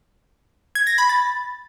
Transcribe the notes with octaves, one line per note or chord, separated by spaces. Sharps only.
G#6
A#6
B5
A6